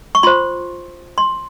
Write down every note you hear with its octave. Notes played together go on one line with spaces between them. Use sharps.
C#6
F4 C5 C6
C6